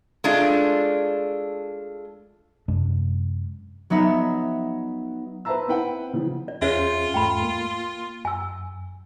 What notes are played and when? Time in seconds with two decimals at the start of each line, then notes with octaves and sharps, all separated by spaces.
0.24 G#3 A3 D4 F4
2.68 F#2 C3 G#3 D4
3.90 F#3 B3 D#4 E5
5.45 B4 C5 E5 A5 A#5 E6
5.68 C4 E4 B4 F#5 G5
6.13 C#3 E3 F3
6.48 D5
6.62 E2 C#4 F4 G#4 C5 C#5 E5
7.14 E2 G#2 A3 G5 B5
7.43 A#3
8.25 F#2 G#5 E6